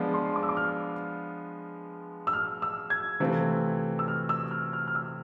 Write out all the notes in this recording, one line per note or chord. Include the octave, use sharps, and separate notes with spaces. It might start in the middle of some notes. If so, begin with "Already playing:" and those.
Already playing: F3 G#3 B3 D4 F4
C6
D6
E6
D6
F6
E6
F6
E6
G#6
C3 E3 A3 C4 F4
E6
F6
E6
F6
F6
F6
E6